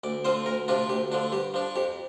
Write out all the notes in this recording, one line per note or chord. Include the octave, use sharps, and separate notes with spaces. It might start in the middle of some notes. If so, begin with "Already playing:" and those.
D2 D5
D3 F3 C4 F4 C5
D2 A#4
C3 F3 D4 F4
D2 G4
D3 F3 D4
G2 G4
F3 D4
F2 G4